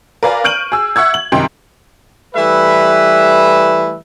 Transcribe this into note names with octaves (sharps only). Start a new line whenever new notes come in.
A#4 B4 D5 F5 G#5 A#5
C#6 F6 G6 D7 D#7 F#7
G#4 E6
E5 F#5 C#6 E6 G#6
F#7
C2 F#2 C3 D#3 G5 C6
E3 G3 A3 B4 E5